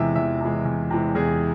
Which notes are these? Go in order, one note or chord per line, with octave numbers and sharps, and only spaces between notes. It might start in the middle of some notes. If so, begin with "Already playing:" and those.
Already playing: E2 C3 E3 G#3 E5
E2 E5
C3 E3 G#3
E2
C3 E3 G#3
E2 G#4